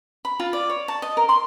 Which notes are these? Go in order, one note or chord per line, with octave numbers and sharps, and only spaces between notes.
B5
F4
D5
C#5
A5
D#5
A#4
C6